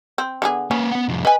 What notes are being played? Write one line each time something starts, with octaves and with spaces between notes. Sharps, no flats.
C4
D3 B3 G#4
A#3 C#4 B4
B3 F#5
C2 F2
B4 D#5 G#5